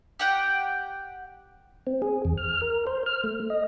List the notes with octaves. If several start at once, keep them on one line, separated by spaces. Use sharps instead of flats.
G4 F#5 G5
C4
G#4
E2
F6
A#4
C5
F6
A3
D#5